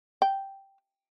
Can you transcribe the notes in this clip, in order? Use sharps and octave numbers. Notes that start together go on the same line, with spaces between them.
G5